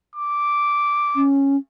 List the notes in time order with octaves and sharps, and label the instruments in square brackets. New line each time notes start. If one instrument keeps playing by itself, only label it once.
[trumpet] D6
[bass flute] C#4